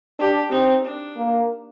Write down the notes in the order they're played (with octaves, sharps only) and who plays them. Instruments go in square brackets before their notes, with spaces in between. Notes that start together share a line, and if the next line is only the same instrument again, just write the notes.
[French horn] D4 [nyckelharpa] G4
[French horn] C4 [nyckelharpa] D#4
[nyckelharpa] D4
[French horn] A#3